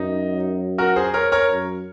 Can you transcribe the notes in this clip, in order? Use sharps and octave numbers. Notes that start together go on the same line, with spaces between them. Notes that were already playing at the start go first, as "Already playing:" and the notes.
Already playing: F#2 D#4
F#4 A#4
G#4 C5
A#4 C#5
A#4 C#5
F#2